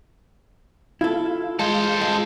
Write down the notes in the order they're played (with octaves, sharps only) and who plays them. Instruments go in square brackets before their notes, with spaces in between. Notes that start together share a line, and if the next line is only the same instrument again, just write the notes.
[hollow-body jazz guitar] E4 A4 [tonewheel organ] F4
[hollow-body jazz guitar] G#3 [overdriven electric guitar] A4 C5
[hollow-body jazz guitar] G#3